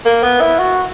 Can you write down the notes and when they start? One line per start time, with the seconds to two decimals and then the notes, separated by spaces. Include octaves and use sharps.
0.05 A#3
0.23 B3
0.41 E4
0.59 F#4